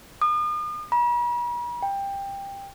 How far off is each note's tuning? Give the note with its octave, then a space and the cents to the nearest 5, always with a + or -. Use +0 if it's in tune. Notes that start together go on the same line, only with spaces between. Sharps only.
D#6 -40
B5 -45
G5 +15